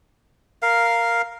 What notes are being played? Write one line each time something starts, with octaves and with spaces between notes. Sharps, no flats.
A#4 F5